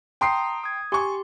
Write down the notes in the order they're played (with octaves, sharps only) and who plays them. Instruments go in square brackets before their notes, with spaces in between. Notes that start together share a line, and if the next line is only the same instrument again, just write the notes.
[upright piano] G5 C6 C7 [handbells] A5 A#5 D#6
[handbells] D#6 G#6
[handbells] G4 C6 [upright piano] G#5 C#6